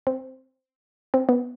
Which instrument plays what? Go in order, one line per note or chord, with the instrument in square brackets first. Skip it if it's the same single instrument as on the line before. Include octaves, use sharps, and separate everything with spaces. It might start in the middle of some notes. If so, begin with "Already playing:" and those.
[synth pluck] C4
C4
B3